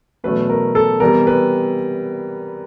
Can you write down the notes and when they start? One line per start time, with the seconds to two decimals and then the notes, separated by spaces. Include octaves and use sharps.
0.24 E2 B2 F#3 A3 C#4 B4
0.49 A#4
0.75 A4
1.00 C3 E3 G3 B3 A#4
1.27 B4